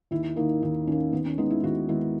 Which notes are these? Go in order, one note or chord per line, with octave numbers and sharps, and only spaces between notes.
D#2 E4
D#3 A#3 D#4
D#2 D#4
D#3 A#3 C#4
D#2 B3
C#4
D#3 G#3 B3 D#4
E4
D#2 F#4
D#3 G#3 B3 E4